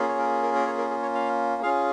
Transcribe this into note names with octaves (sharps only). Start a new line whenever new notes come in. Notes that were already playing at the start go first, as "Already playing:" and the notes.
Already playing: A#3 C#4 F4 G#4
C#5
A#4
A#4
A#4
C#5
A#4
G#4
C#5
F5
C#4 F4 G#4 F5